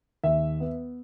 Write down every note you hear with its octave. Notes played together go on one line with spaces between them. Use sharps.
D#2 E5
B3